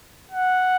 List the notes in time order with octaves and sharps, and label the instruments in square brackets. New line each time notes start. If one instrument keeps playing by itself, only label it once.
[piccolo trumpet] F#5